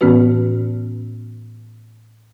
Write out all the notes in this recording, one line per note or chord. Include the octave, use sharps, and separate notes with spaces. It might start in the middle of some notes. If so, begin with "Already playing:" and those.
A2 E3 B3 C#4 F#4 B4